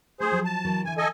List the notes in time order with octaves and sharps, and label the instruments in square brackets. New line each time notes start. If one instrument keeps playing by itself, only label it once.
[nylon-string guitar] A3 D4 G4 [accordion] G#4 C5
[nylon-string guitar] F3 F#3
[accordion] A5
[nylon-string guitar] E3 F#3 A#4
[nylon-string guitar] D3 E3 [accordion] G#5
[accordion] A4 D#5 G#5